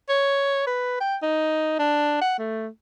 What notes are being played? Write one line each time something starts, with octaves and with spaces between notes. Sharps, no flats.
C#5
B4
G5
D#4
D4
F#5
A3